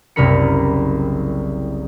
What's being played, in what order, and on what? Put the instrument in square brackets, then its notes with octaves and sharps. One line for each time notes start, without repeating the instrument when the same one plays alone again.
[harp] F#1 C2 G3 A#4 B5 C#7